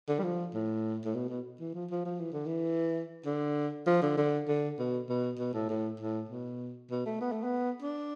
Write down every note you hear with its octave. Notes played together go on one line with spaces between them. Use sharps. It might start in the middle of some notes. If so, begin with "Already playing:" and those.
D3
G3
F3
A2
A2
B2
B2
E3
F3
F3
F3
E3
D3
E3
D3
F3
D3
D3
D3
B2
B2
B2
A2
A2
A2
B2
B2
A3
B3
A3
B3
D4